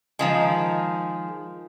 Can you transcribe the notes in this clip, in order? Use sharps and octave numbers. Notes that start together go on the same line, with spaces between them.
D#3 F3 G#3